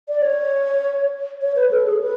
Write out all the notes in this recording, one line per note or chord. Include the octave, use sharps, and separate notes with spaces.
D5
C#5
C#5
B4
A4
G#4
B4